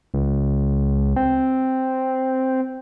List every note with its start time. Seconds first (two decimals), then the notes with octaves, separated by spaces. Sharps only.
0.14 C#2
1.16 C4